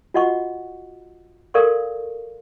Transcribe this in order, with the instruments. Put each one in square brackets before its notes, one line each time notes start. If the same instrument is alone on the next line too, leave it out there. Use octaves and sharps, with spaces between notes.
[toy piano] F4 F#4 D#5 F#5 C#6
A4 A#4 D5 F5 C6 C#6